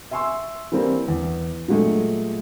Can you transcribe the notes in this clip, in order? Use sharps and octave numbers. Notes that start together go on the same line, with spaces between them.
E5 G#5 C6 C#6 E6
E3 G3 A#3 C4
E2
A#2 F#3 G#3 A3